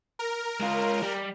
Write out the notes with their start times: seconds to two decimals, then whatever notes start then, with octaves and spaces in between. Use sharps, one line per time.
0.19 A#4
0.60 G#3 F4
1.03 G3